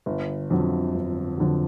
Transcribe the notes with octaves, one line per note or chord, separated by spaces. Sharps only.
G1
F2 D3 F#3
G1
F2 D3 F#3